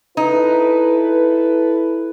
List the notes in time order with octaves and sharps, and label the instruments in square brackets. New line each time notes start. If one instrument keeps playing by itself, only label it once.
[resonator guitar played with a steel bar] D#4 [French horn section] E4 A4 B4